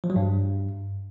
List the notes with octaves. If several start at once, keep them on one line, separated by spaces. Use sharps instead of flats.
F3
F#3
G2